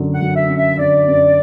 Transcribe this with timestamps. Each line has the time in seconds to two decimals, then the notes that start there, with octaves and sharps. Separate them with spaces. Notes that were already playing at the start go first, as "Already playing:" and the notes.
Already playing: F#2 D3 F#3
0.14 F#5
0.21 F#3
0.36 E5
0.50 C#4
0.57 E5
0.78 D3 D5
1.08 F#2